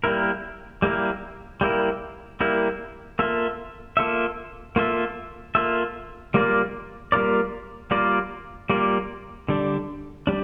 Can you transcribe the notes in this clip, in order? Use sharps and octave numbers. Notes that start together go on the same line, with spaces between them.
G3 A#3 E4 A#4
G3 A#3 E4 A#4
G3 A#3 E4 A#4
G3 A#3 E4 A#4
A#3 F4 A4 E5
A#3 F4 A4 E5
A#3 F4 A4 E5
A#3 F4 A4 E5
G3 A#3 F4 A#4 D5
G3 A#3 F4 A#4 D5
G3 A#3 F4 A#4 D5
G3 A#3 F4 A#4 D5
D3 G3 D4
G3 D4